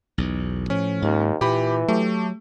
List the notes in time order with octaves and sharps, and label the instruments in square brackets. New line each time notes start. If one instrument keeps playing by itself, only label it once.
[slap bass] B1 E2
[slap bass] A2 F3 [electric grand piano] C#4
[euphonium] D#2 [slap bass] G#2
[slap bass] A#2 [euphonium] E3 [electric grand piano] G4 B5
[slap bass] F#3 [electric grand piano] A3 G4